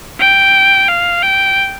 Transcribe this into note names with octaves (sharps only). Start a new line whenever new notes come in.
G5
F5
G5